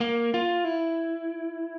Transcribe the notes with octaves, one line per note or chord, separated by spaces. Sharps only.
A#3
F4
E4